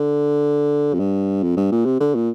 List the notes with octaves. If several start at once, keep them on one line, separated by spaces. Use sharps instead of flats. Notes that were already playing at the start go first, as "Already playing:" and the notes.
Already playing: D3
F2
G2
F2
G2
A#2
C3
D3
A#2